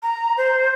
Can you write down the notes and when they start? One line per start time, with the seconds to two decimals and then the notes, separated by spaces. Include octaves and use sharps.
0.03 A#5
0.37 C5